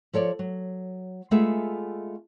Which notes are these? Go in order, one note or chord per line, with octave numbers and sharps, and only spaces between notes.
F3 A4 C#5 D5
F#3
G#3 A3 B3 F4 G#4 E5